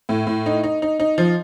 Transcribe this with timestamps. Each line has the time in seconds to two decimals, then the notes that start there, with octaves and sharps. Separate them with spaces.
0.09 A2
0.27 A2
0.46 D#4
0.63 D#4
0.82 D#4
1.00 D#4
1.18 F3